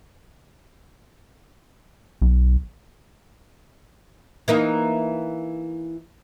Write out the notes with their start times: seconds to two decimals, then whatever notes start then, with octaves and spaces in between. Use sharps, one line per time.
2.22 B1
4.48 E3 A#3 D#4